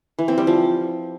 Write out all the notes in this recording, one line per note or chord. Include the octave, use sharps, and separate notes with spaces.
E3
C4
G3
F3